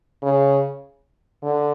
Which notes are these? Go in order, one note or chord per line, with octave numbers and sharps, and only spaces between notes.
C#3
D3